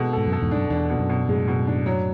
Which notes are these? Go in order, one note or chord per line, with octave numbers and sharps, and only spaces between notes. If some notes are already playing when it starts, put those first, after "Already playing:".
Already playing: B2 G#3 A4
G#2 A4
F#2
A4
E2 G#2
F#2 D4
E2 D4
B2
F#2
B2
F#2 A2 G#3
B2
D4
F#3